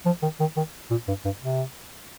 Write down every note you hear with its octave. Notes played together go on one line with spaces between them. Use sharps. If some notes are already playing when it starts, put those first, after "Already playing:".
F3
D#3
D#3
D#3
A#2
G2
G2
C3